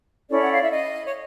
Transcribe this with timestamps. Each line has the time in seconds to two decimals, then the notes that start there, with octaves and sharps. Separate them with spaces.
0.30 C#4 E4 A4 C#5 D5
0.42 F#5
0.52 F5
0.62 E5
0.71 D#5
1.05 C#5